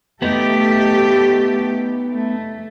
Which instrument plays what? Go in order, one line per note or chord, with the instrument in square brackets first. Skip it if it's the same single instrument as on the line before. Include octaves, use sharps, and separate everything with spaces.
[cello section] A3 G4 A4 [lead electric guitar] B3 D#4
[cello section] A3